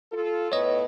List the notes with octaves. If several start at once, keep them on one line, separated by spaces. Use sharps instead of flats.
F4 A4
A2 B3 B4 C#5 D#5